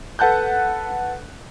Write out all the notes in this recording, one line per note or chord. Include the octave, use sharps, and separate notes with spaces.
A4 B4 F#5 A5 F#6 G6